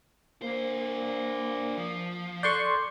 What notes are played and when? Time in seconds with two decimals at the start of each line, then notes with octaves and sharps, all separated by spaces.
0.42 A#3 D4 C5
1.77 F3
2.43 A4 D5 C6 C#6 F#6 G6